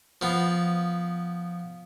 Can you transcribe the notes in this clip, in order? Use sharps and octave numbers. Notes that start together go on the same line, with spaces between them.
F3 B3